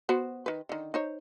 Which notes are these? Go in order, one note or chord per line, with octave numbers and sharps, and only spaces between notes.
B3 F#4 C5
D#3 B4
D3 D#3
D#4 C5 C#5